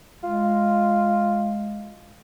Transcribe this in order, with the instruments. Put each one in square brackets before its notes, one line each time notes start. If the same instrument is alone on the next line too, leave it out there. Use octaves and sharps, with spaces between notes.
[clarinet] G#3 [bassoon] F4